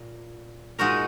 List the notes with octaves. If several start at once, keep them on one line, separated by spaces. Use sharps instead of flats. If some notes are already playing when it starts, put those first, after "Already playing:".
Already playing: A#2
A#2 G#3 D#4 F#4 A#4